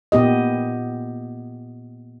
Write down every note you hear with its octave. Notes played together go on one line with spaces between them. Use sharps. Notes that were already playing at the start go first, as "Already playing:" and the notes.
A#2 B3 G4 D#5